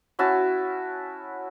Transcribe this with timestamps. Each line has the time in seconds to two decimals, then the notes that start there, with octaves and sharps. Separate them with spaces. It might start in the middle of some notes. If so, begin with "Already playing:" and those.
0.19 C#4 E4 F#4 A5